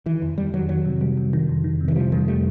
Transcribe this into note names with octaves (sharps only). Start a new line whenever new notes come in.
D#3 E3
F2
F2 G3
D#3 F#3
D#3 F#3
C3
G3
C3
D#3
F2
D#3
C3
E3
F3 G3
F2 D#3
G3 A3